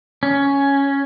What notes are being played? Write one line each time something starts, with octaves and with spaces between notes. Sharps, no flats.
C#4